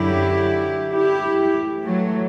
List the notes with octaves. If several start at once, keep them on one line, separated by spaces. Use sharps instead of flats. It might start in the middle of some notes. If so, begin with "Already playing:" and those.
Already playing: F#2 D3 F#3 E4 G4
E4 G4
A2 E3
F#3 A3